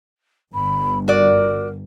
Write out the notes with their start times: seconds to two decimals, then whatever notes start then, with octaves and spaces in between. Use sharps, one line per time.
0.54 G1 B5
1.08 F#4 A#4 D5